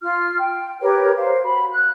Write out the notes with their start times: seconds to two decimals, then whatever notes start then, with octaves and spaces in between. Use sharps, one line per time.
0.01 F4 F6
0.38 G5
0.81 G4 A#4 B4 C#5
1.16 C5 F5
1.42 F#4 B5
1.71 F#6